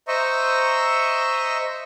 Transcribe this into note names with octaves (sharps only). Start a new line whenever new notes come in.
C5 D#5 E5 A#5 C#6